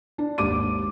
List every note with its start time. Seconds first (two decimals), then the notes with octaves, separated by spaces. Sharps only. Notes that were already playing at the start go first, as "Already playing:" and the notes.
0.18 D4
0.38 G#1 D#2 D6 D#7